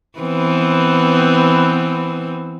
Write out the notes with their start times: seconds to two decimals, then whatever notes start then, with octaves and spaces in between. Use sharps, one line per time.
0.19 E3 B3 C4